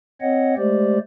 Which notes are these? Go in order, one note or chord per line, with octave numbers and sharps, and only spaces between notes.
C4 C#5 D#5 F#5
G#3 A3 G4 C5 D5